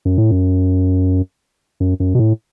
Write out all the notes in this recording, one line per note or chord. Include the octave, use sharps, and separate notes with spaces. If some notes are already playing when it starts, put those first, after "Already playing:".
F#2
A2
F#2
F#2
F#2
B2
A2